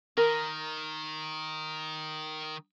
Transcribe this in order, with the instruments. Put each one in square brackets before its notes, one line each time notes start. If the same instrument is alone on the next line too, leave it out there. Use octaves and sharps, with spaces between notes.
[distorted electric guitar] D#3 [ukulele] A#4